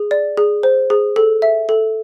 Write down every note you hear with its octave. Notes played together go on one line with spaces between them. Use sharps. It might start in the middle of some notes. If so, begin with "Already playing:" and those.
Already playing: G#4
D5
G#4
C5
G#4
A4
E5
A4